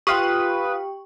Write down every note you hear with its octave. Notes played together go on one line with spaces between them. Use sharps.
F4 G4 B4 F5 G5 C#6 D#6